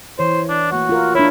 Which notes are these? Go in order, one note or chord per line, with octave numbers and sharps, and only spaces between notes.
E3 C5 C#5
D4
A3 A#3 F#4
F4 A#4
D4 E4 C#5